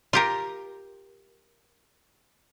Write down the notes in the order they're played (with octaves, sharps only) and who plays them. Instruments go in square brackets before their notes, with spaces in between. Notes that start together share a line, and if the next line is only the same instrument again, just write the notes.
[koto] F4 G4 A#4